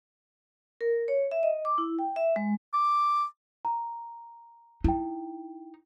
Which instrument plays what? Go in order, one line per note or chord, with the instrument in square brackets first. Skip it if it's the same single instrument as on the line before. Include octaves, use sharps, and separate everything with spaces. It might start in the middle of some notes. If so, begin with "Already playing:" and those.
[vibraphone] A#4
C#5
E5
D#5
D6
E4
G5
E5
G#3
[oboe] D6
[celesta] A#5
[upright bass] D#4 [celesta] E4 G5